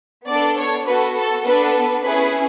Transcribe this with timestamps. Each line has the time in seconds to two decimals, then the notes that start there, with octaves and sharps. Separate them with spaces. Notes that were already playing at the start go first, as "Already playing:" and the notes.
0.26 B3 D4 A4 D5
0.57 C#5
0.86 B3 F#4 A4 B4
1.16 A4
1.44 B3 D4 A4 B4
2.04 C#4 E4 G#4 B4